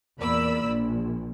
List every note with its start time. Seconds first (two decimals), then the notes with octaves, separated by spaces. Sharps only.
0.20 E2 A#2 A#3 D5 B5 E6
0.67 A#1